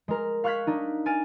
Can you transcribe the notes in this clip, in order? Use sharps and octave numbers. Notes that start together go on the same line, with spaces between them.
G#3 A#4
F5 C#6 F6 F#6 G#6 B6
D4 D#4
G#5 F6 A6 D7